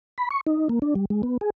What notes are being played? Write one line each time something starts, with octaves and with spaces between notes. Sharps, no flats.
B5
C#6
D#4
A#3
D4
G3
G#3
B3
G#4